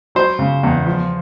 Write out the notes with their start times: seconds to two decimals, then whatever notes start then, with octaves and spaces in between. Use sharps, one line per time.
0.15 F#3 C5
0.39 C#3
0.63 E2
0.86 F3